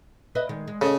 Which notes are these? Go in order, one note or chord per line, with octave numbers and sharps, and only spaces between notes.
B4 D#5 E5
D#3 G#3
G#3
C#3 A4 C#5 D#5